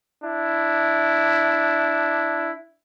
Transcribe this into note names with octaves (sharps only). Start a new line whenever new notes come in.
D4 E4